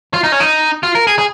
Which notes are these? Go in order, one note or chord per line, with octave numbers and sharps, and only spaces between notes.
F4
D#4
C#4
D#4
F4
A#4
G#4
G#4